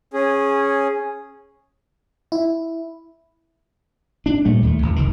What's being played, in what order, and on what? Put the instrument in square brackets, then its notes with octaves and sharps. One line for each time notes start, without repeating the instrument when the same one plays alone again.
[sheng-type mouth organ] C#4 G#4
[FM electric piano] E4
[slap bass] D4
A#2 G3 A3
D#2 G#3 A3
G#1 F2
F1 C2 D#3